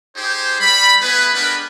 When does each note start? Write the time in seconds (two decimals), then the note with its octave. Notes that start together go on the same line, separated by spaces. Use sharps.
0.16 D#4 G4 G#4 C5
0.60 G3 B5
1.01 A3 B3 E4 G#4 B4
1.33 G#3 B3 D4 G4 A#4 B4